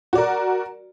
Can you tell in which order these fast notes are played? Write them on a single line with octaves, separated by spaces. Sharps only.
F#4 D5 A#4